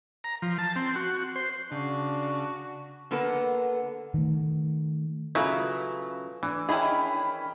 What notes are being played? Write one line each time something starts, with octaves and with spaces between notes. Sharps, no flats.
A#5
F3
A5
C4
F#4
C5
C#3 D4 F#4
D3 A#3 B3 A4 B4
D#3 A3
C#3 F#3 E4 F4 A4 B4
E3 D4
D#3 C#4 E4 G#4 G5 B5